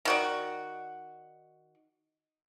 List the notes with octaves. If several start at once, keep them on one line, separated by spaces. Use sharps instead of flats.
D#3 F#4 D5